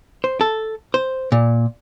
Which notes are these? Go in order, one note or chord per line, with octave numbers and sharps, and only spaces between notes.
C5
A4
C5
A#2